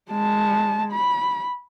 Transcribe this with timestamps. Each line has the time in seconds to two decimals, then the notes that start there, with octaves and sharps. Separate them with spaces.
0.12 G#3 A5
0.92 B5